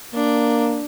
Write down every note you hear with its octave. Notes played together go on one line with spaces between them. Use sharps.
A#3 D4